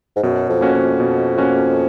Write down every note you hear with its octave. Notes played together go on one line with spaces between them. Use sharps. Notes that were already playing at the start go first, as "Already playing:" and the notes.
G#2
F#2 B2
F2
A#3 C#4 F#4
F2
B2
A#3 C#4 F#4